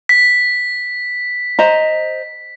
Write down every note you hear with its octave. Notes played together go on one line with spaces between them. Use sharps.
B6
C5 D#5 A#5